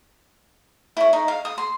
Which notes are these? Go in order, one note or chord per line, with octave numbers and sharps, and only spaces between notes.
E4 C#5
D#4
F5
D#6
C6